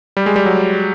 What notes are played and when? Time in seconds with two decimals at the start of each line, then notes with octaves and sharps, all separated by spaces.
0.17 G3
0.26 G#3
0.36 G3
0.45 F#3